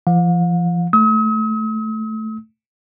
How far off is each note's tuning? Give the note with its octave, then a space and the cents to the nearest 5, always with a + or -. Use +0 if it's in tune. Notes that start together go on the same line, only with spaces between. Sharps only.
F3 -40 F5 +45
A3 +0 D#6 +45